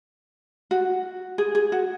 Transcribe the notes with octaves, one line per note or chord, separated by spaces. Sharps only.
F#4
G#4
G#4
F#4